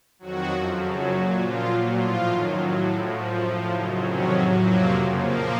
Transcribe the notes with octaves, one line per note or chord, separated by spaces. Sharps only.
F2 D#3 F#3 F#4
F#2 F3
F#2 C#3 F#3 A4
A#2 F#3 F#4
A#2 F3 F4
A#2 F#3
A2 F3 F4
F#2 D#3 F#3
A2 F#3
A2 F3 A4
F#2 F3 F#4
A2 F3 F4
F#2 C#3 F#3 D#4
F2 C3 D#3 F#3 C#4
A2 F#3
F2 C3 F#3 A#3
F#2 C#3 F3
A#2 F3 A#3